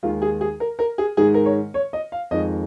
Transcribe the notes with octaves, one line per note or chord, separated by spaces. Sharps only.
D#2 D#3 G#3 F4
G#4
G#4
A#4
A#4
G#4
G#2 D#3 G#3 G#4
A#4
C#5
C#5
D#5
F5
F2 D#3 G#3 D#5